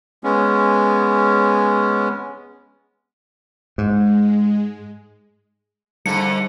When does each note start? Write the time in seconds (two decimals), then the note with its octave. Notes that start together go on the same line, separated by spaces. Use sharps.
0.24 G#3 B3 C#4
3.78 G#2 G#3
6.06 G#2 D3 G3 A#3 C#7